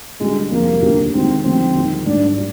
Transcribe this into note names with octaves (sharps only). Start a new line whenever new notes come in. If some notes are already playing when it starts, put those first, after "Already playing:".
D2 D3 G3 G#3
F1 F2 C3 G3 A#3 C4
D#2 D3 G3 D4 G4
D2 C3 D#3 G#3 C4
D2 D3 F3 G#3 C4 D#4
D#2 D#3 G3
G#1 G#2 G3 A#3 D4
G3